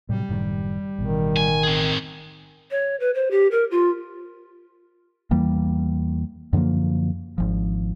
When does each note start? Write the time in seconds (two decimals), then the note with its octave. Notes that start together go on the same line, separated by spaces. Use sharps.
0.09 A2 C3 F#3 G3
0.29 F#1 A2 D#3
0.98 A1 B2 D#3
1.37 G#5
1.63 C4 G#4
2.71 C#5
3.00 B4
3.14 C5
3.31 G4
3.51 A#4
3.71 F4
5.31 E2 E3 G3 A#3
6.53 F#2 D3 F3 A#3
7.38 G#1 F3